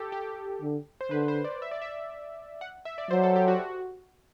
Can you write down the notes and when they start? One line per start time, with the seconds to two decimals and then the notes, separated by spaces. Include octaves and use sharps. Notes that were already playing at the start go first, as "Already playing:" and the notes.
Already playing: G4 A4
0.12 G4
0.62 D3
1.01 C5
1.11 D3 B4
1.28 C5
1.44 D5
1.62 E5
1.71 D5
1.82 E5
2.61 F#5
2.85 E5
2.98 D5
3.11 F#3 C5
3.23 A4
3.36 G4
3.48 F#4